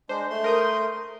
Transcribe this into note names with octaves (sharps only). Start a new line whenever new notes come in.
G#3 D4 C5
A3 C6
A#4 D#6 G6